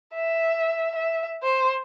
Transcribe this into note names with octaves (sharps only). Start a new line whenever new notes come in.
E5
E5
C5